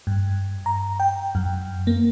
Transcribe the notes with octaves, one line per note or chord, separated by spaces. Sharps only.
G2
A#5
G5
F#2
A#3